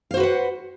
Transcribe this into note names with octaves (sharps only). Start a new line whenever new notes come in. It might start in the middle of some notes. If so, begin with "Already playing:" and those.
F#4 B4 C5 F5 F#5